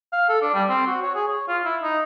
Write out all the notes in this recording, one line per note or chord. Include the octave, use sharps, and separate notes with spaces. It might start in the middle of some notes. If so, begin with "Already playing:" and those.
F5
A4
D4
G3
C4
F#4
C#5
G#4
C#5
F4
E4
D#4